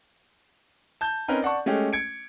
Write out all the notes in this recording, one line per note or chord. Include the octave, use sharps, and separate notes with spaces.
A5 G6
C4 C#4 D#4 A#4 B4
D5 F#5 A5 C#6
G#3 A3 C#4 G4
G#6 C#7 D7